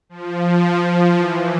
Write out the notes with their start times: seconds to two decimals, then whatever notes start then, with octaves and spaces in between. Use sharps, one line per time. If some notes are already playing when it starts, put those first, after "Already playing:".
0.09 F3
0.82 F3
1.17 E3